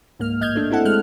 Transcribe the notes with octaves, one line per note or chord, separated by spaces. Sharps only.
C#2 G#2 A#3 F6
A1 D#5 F6 G6 G#6
A3 D4
C4 E4 A4 F#5
G#3 F6 F#6